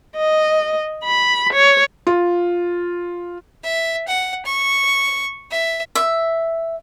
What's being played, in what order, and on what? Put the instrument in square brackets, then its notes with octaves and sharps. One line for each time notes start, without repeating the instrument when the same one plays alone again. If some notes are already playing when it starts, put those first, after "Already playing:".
[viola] D#5
B5
C#5
[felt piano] F4
[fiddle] E5
F#5
C#6
E5
[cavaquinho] E5